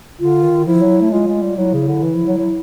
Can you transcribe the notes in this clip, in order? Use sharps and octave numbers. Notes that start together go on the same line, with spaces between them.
D3 F4
D#3
F3 E4
F#3
A3
G#3 F4
G#3
G3
F#3 E4
C#3
D3
E3
F3
F#3
F#3